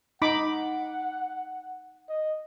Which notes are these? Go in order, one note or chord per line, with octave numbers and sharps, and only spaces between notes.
D#4 F#5 B5 D6
D#5